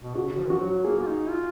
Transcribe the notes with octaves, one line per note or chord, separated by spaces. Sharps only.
B2
C#3 F#4
F3
D#3
F3 F#4
F#3
A#3 G#4
F4
D#4
F4